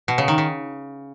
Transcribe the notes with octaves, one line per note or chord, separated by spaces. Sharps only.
B2
C#3
D#3
C#3